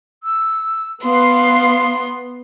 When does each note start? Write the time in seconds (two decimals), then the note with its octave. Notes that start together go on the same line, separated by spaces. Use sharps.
0.23 E6
1.05 B3 F5 C6